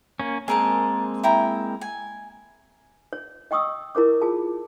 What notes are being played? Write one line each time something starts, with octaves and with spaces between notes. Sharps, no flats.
A#3 C#4
G#3 A#3 C4 G#4 A#4 A5
E4 G5 A#5
G#5
C#5
D#5 G5 C#6 D#6 E6
E4 A#4 C#5 D6
F4 G#4 A5